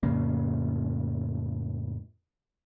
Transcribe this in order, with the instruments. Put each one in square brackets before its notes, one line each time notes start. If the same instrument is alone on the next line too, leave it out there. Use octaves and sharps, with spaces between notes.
[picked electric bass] F2 A2 C#3 A#3